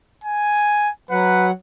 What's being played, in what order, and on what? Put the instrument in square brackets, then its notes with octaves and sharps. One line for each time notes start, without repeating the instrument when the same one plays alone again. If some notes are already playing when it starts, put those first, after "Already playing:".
[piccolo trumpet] G#5
[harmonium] F#3 F#5 [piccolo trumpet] B4